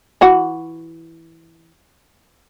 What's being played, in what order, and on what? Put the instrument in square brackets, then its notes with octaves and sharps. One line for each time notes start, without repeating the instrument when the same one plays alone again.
[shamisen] E3 F#4 F#5